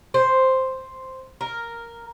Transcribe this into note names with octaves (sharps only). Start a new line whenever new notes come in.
C5
A#4